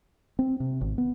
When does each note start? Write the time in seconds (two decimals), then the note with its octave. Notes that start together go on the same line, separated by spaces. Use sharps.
0.39 C4
0.60 C3
0.81 G#1
0.98 B3